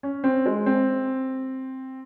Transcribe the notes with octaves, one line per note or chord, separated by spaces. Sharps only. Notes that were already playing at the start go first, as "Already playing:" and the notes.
C#4
C4
G#3
C4